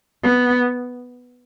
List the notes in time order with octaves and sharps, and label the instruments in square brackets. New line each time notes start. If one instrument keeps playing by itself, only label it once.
[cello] B3